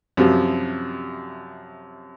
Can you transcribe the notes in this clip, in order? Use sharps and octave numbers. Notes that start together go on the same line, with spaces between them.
F#2 C3 F3 G3